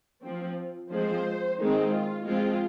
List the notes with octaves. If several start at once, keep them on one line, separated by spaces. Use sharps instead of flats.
F3 C4
F3 G#3 C4 C5
D#3 G#3 C4 D#4
F4
F3 G#3 C4 F4